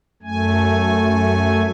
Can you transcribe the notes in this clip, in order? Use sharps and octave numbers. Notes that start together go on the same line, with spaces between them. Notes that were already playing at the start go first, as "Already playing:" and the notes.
F#2 A3 G#5